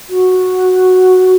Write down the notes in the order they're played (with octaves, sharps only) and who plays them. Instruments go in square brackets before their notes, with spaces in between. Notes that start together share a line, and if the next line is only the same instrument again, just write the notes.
[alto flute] F#4